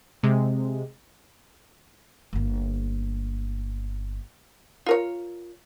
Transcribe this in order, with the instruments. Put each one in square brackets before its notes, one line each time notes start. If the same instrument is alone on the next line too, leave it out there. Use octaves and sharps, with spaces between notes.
[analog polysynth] C3 G#3
[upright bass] G1 A#3
[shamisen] F4 A#4 C#5